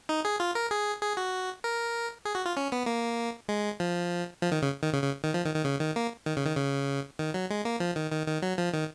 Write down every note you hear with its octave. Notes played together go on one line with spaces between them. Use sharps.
D#4
G#4
F4
A#4
G#4
G#4
F#4
A#4
G#4
F#4
F4
C#4
B3
A#3
G#3
F3
F3
D#3
C#3
D#3
C#3
C#3
D#3
F3
D#3
D#3
C#3
D#3
A#3
D#3
C#3
D#3
C#3
D#3
F#3
G#3
A#3
F3
D#3
D#3
D#3
F#3
F3
D#3